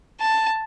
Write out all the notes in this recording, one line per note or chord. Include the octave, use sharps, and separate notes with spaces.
A5